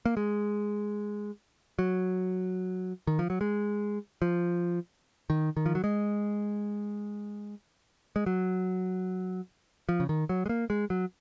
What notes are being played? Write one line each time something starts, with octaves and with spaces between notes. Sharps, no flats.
A#3
G#3
F#3
D#3
F3
F#3
G#3
F3
D#3
D#3
F3
F#3
G#3
G#3
F#3
F3
C#3
D#3
F#3
G#3
A#3
G#3
F#3